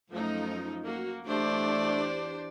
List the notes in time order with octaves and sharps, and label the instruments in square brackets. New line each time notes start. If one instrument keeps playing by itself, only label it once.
[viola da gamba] F#2 [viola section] F3 A3 D#4
[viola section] A#3 F#4
[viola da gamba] E2 D5 [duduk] A3 [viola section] D4 G4 C5